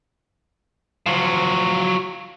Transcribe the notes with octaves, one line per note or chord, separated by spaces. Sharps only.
F3 F#3